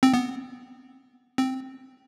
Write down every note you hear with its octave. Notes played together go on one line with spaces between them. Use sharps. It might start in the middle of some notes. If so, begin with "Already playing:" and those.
C4
B3
C4